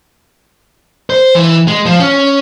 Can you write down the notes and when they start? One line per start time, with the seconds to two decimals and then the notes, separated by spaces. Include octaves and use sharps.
1.10 C5
1.35 E3
1.68 G#3
1.86 F3
2.00 C#4